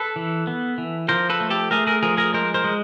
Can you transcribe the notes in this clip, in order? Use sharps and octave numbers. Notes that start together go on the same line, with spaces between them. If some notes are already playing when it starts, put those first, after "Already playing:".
Already playing: A4 B4
E3
B3
E3
F3 A#4 C5
A4 B4
A3
G4 A4
A3 G#4 A#4
G#4 A#4
F3 G#4 A#4
G#4 A#4
G#3 A#4 C5
A#4 C5
G#3